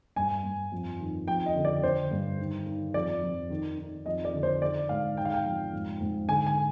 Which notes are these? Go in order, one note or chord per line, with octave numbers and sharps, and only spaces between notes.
G2 G#5
G2
F2
D#3
F2 G5
D#5
D3
D5
D3 C5
G2
D#3
D#3
F2 D5
F2
D#3
D#3
F2 D#5
D5
D3
C5
D#3 D5
G#2 F5
D#3 G5
F5
G5
F2
G#2
G#2
D3 G#5
G#5